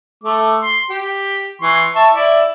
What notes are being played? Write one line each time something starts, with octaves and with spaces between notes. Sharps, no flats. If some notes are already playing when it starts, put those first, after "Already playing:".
A3 D6
C6
G4
E3 C6 C#6
E5 A5 C#6
E4 D5